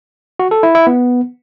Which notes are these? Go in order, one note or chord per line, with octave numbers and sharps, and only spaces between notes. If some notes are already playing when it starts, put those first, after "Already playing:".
F#4
A4
E4
E4
B3